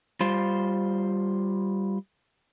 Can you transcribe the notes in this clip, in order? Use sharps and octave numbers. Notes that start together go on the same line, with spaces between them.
G3 F4 C5